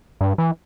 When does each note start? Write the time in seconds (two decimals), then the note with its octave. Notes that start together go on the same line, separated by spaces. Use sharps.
0.21 G2
0.38 E3